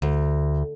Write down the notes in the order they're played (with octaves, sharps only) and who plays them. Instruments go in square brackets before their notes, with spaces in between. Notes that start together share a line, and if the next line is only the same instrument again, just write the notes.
[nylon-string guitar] D2